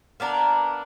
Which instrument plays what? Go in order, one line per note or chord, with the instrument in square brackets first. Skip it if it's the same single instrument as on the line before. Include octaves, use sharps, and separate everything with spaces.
[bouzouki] A#3 B3 D4 A#4